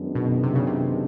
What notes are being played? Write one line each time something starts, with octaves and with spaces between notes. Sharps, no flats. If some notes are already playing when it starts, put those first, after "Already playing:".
Already playing: F#2 D#3 G#3 B3 D4
B2
C3
C#3
C3